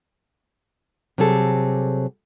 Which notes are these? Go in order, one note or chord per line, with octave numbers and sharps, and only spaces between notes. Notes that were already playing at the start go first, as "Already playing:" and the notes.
C3 F#3 G3 G#4 A4